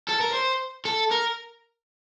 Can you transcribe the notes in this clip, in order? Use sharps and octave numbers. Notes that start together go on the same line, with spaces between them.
A4
A#4
C5
A4
A#4